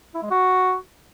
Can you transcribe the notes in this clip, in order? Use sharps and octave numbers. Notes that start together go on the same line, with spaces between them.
E4
G#3
F#4